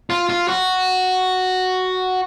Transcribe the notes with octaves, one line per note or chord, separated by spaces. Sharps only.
F4
F4
F#4